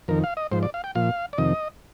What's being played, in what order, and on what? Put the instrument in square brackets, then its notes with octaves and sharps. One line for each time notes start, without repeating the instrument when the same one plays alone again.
[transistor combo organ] F2 D#3 A#4
F5
D#5
G#2 F3 C5
D5
F5
G5
A#2 F3 F5
D5
F2 C3 D#3 D#5